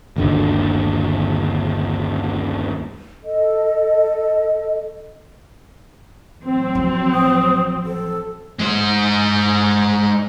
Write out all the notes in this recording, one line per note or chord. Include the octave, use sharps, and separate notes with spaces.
G1 D#2 D3
A4 D#5
A1 F#3 C4
F3
D#6
A4
G#3 C5